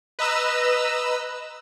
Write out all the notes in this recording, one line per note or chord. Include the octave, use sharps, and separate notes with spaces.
B4 D#5 A#5 E6